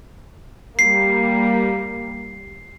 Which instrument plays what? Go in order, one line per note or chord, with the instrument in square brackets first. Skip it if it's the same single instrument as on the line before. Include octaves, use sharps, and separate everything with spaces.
[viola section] G3 A#3 [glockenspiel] C7